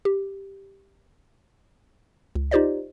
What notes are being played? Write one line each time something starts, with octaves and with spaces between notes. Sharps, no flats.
G4
C#2
D#4 F4 G4 C5 D5 D#5